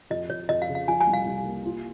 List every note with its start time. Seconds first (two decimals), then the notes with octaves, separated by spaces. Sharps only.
0.10 F2 D#5
0.29 F2 C#5
0.49 F2 D#5
0.62 F5
0.69 C#3
0.75 F5
0.88 F3 G#5
1.01 G#5
1.07 C2
1.14 F5
1.26 C2
1.45 A#3
1.65 F4